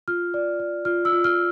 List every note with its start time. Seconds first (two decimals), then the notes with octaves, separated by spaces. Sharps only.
0.08 F4 F6
0.34 D5
0.60 D5
0.85 F4 F6
1.05 E6
1.12 F4
1.24 F6